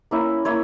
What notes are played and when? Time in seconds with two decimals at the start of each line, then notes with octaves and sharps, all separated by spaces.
0.11 A#3 C#4 E4
0.45 A#3 E4 C#5